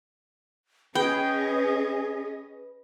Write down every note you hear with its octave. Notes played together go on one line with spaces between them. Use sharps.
C#4 G#4 B4 D#5 G5